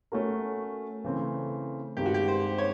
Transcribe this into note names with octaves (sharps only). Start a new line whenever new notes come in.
A3 C#4 F#4 A#4
C#3 E3 A3 C4
G2 D#3 G#3 C4 G4
F#4
G4
C5
C#5